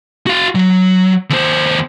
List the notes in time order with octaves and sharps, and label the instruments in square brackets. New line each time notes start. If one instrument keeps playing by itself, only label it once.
[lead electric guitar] F#4 F5
F#3
D#2 C5